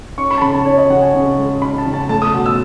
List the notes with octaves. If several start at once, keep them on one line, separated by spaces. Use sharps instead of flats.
C#4 C#6
B5
A5
C#3 B5
A5
C#4 C#5
D#5
C#3 F#5
G#5
C#3
G#3
C#4 B5
A5
C#3
A5
A3 A5
D#6
B2
E6